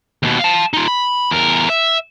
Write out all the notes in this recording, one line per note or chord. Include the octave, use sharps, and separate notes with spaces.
D#2 B2
F5 A5
D#4 F4
B5
E2 A#4
E5